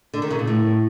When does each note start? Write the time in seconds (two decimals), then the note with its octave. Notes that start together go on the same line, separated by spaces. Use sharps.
0.14 D3
0.22 D#3
0.30 C#3
0.39 A#2
0.47 A2